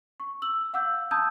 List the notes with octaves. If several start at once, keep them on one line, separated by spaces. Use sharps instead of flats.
C#6
E6 F#7
F5 F#5 D6 E6 G6
A5 A#5 D#6 E6 G6 G#6